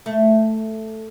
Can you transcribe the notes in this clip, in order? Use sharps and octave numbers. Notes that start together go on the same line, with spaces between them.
A3